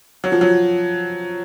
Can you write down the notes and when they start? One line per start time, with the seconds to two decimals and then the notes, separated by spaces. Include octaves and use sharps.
0.24 F#3
0.32 F3
0.41 F#3